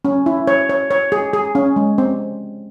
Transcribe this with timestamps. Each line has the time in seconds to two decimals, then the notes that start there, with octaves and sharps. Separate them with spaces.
0.05 C#4
0.26 E4
0.47 C#5
0.70 C#5
0.91 C#5
1.12 G#4
1.33 G#4
1.55 C#4
1.76 G#3
1.98 C4